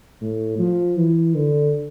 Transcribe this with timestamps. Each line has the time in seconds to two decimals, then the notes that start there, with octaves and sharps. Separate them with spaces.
0.21 A2
0.59 F3
0.97 E3
1.35 D3